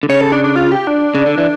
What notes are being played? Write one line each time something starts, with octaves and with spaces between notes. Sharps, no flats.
D3
C#3 C#5
A4
D4
D4
F4
G4
D4
C#3
D3
E3